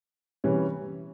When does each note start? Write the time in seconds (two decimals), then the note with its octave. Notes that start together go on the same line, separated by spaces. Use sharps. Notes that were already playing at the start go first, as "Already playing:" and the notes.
0.44 C3 E3 G3 C#4